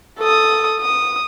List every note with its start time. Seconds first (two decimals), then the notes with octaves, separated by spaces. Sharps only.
0.19 A4 D#6
0.80 D#6